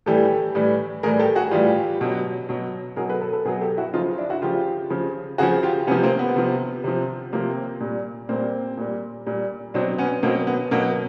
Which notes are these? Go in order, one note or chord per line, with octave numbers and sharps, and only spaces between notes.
A2 E3 G3 G4 A4
A2 E3 G3
A2 E3 G3 G#4 A#4
G4 A4
F#4 G#4
A2 E3 G3 F4 G4
B2 F#3
B2 F#3
B2 F#3 G#4 A#4
A4 B4
A4 B4
A4 B4
B2 F#3 G#4 A#4
G4 A4
E4 F#4
C#3 F3 D#4 F4
D4 E4
E4 F#4
C#3 F3 F4 G4
C#3 F3
C#3 F3 F#4 G#4
F4 G4
C3 F3 B3 C#4
A#3 C4
B3
C3 F3
C3 F3
C3 F3 A#3 C4
A#2 G3
A#2 G3 A#3 C4
A#2 G3
A#2 G3
B2 F#3 C4 D4
B3 C#4
B2 F#3 A#3 C4
B3
B2 F#3 A#3